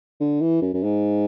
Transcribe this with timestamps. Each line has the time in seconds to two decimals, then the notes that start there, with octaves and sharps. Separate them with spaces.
0.20 D3
0.41 E3
0.62 F#2
0.74 F#2
0.83 G#2